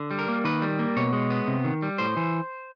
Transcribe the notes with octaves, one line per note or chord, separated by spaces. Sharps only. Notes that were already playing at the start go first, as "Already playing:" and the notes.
Already playing: D3
G3
A#4
A#3
D#3 B4
G3
A#3
B2 C#5
G#3
B3
C3
D#3
G3
A2 C5
E3